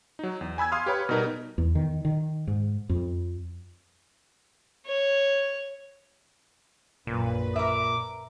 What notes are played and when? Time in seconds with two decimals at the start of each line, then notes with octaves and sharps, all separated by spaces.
0.19 F#3 D#4
0.41 E2
0.58 G#5 B5 E6 G#6
0.72 F5 C6 D#6 F6
0.86 G4 B4 C#5 B5
1.09 B2 G3 D#4 A#4 B4
1.58 E2
1.75 D#3
2.05 D#3
2.47 G#2
2.89 F2
4.86 C#5
7.07 A#1 F#2 A#2 B4
7.56 A#4 E5 D6